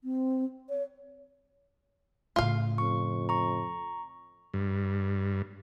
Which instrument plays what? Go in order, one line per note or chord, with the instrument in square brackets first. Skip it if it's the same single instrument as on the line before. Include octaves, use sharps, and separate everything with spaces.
[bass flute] C4
C#5
[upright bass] A2 C#3 [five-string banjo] F4 F5
[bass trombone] F2 [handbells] C#6
[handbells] A#5 C#6
[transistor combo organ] G2